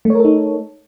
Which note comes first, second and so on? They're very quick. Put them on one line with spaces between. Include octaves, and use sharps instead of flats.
A3 C#5 A#4 A4 D#4